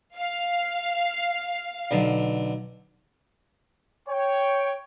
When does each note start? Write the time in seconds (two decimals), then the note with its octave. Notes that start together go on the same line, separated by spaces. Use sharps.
0.16 F5
1.91 B1 D3
4.08 C#5 G5